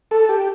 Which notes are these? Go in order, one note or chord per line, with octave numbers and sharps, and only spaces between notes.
A4
G4